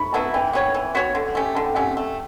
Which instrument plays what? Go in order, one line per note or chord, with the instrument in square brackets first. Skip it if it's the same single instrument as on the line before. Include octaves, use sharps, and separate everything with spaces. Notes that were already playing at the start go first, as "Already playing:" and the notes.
Already playing: [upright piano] B5 C#6
[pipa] F#3 B3 E4 [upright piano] A5
[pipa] E3 [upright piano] G5
[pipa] B3 F#4 C#5 [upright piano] G5
[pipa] E3
B3 F#4 C#5
D3
A3 C#4 G4
[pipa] D3 [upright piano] A5
[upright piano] G5
[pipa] A3 C#4 G4 [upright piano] F#5
[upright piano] G5
[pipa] A3